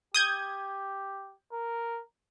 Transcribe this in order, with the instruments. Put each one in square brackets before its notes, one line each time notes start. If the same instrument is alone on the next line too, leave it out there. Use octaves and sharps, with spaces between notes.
[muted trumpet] G4 [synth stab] D#6 G6 G#6
[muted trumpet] A#4